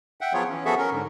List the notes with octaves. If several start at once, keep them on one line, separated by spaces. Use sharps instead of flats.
E5 F#5 G5
F3 F#3 B3 F4 G#4 C#5
E3 C#4
F3 B3 F#4 G#4 A4 E5
C#4 A#4
G#2 D3